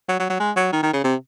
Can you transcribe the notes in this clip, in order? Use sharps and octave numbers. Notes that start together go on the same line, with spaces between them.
F#3
F#3
F#3
G#3
F#3
D#3
D#3
C#3
C3